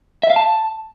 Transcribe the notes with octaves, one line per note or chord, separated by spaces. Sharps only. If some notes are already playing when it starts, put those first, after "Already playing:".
E5
F5
A5